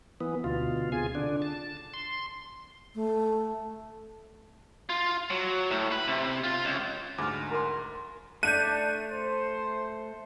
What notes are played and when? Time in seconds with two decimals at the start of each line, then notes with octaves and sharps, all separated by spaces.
0.20 E3 B3
0.44 D2 B2 F4
0.92 C3 F4 G#4 G#5
1.15 D3 D4
1.42 A5
1.94 C6
2.95 A3
4.89 F4
5.30 F#3
5.71 A2
5.92 B4
6.08 C3
6.44 F4
6.65 C#2
7.18 D2 G#2 D6 F6
7.51 A#4 C6
8.43 A3 D4 F#6 G6 D#7
9.10 C5